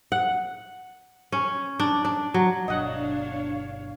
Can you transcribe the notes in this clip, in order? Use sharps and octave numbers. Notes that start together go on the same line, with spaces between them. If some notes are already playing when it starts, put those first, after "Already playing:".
F#5
C#4
D4
D4
F#3
G1 B2 F#3 D4 C#5 D#5 F5 F#5